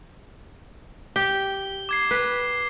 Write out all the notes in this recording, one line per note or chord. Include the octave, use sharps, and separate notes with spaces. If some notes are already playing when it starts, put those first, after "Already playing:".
G4 G7
D6 G#6 C7
B4